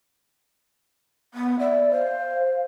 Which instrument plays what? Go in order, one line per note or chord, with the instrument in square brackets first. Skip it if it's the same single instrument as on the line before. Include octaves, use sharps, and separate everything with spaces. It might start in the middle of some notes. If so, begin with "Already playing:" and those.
[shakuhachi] B3
[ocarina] D5 [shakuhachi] E5
[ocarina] C5 [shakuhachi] F5